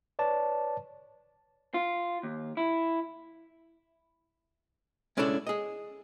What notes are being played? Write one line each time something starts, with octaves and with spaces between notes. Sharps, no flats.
B4 C#5 D5 A5
F4
D#2
E4
G#3 C#4 D4 E4 A4 D5
G#4 D#5